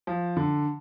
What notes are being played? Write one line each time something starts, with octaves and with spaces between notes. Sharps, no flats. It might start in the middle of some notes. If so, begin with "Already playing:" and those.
F3
D3